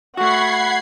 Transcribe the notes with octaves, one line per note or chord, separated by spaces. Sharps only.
A3 F#4 F#5 B5 G#6 C7